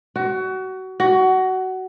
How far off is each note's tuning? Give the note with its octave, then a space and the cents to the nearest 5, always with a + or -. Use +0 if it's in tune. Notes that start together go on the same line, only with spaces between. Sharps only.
F#4 +25
F#4 +20